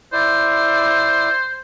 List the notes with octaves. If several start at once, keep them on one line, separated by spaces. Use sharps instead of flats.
E4 C5 D5